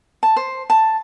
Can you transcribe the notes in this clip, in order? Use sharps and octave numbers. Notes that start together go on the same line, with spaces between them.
A5
C5
A5